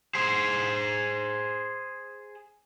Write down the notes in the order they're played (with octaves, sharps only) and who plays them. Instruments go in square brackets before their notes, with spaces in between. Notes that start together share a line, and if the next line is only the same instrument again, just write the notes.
[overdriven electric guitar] G#4 C5